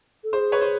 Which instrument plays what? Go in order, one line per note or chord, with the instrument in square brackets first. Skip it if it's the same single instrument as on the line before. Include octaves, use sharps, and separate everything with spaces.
[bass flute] A4
[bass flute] G#4 [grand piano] C5
[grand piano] B4 C#5
C5